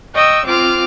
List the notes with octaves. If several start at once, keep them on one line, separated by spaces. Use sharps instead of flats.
D#5 G5 C#6 E6
C4 F4 D6 F6